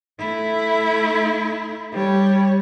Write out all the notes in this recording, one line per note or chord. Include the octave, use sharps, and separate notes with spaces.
A3 E4
G3 C#5